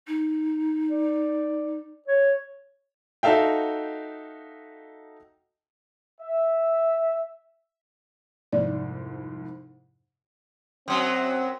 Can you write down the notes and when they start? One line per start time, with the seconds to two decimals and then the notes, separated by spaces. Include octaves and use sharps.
0.07 D#4
0.90 D5
2.08 C#5
3.23 D#4 F#4 A4 E5 F5 G5
6.21 E5
8.53 C2 F2 G#2 D5
10.88 F#2 F#3 C4